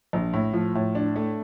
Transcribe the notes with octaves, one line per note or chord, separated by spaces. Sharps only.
A#1
A2
F3
A2
D4
A3